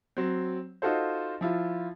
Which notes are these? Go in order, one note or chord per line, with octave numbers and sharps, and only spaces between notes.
F#3 C4
D#4 F4 F#4 A4 C5
F3 E4 F4